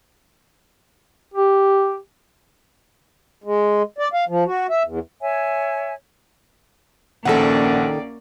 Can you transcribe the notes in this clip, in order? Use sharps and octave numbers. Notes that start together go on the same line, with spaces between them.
G4
G#3
D5
F5
F3
F#4
E5
E2
C#5 E5 G#5
A#1 D#3 A#3 C#4 A4 D5 F#5